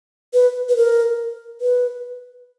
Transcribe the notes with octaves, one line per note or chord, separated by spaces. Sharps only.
B4
B4
A#4
B4